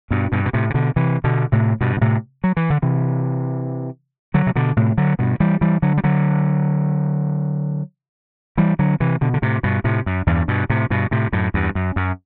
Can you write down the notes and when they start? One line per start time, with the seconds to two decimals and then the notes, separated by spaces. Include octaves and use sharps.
0.11 G2 B2
0.32 G2 B2
0.46 B2
0.53 A2 C3
0.70 C3
0.74 B2 D3
0.96 C3 E3
1.24 B2 D3
1.52 A2 C3
1.81 G2 B2
1.97 B2
2.01 A2 C3
2.44 F#3
2.57 E3
2.70 D3
2.82 C3 E3
4.34 D3 F#3
4.47 C3
4.56 B2 D3
4.77 A2 C3
4.98 D3 F#3
5.19 G2 B2
5.40 E3 G3
5.61 E3 G3
5.82 D3 F#3
5.97 G3
6.04 D3 F#3
8.58 E3 G3
8.79 D3 F#3
9.00 C3 E3
9.21 B2 D3
9.34 D3
9.42 A2 C3
9.63 G2 B2
9.84 A2 C3
10.06 F#2
10.27 E2 G2
10.48 G2 B2
10.70 A2 C3
10.90 G2 B2
11.11 A2 C3
11.33 F#2 A2
11.54 E2 G2
11.75 F#2
11.96 F#2